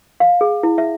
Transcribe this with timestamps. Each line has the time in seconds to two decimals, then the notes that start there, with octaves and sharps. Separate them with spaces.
0.20 F5
0.41 G#4
0.63 E4
0.78 E5